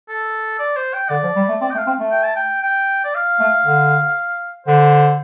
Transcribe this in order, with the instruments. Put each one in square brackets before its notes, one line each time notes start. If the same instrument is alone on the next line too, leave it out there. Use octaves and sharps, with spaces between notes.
[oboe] A4
D5
C5
G5
[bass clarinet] D3 [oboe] D5
[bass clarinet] F3
G3
A3
[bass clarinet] C4 [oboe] D5
[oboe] G5
[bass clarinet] A3
[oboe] F5
[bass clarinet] C4
A3
[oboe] G5
A5
G5
G5
D5
F5
[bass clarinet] A3
D3
[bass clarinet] D3 [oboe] C5